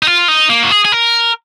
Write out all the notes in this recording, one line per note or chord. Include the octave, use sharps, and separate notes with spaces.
D#4
F4
D#4
A#3
F#4
G#4
G#4
A#4